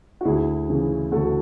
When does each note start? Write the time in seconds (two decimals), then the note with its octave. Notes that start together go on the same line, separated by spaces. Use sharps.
0.21 F#4
0.25 D2 E4 G#4
0.69 C#3 E3
1.12 D2 F#4 A4